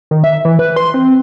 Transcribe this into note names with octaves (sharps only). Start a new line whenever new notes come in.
D#3
E5
E3
B4
C6
C4